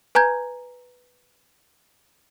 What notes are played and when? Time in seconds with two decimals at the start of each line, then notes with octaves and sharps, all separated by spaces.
0.15 B4 G#5 A#5 G6 G#6